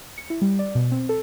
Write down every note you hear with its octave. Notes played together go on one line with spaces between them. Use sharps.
C#7
E4
G3
D5
B2
C4
A4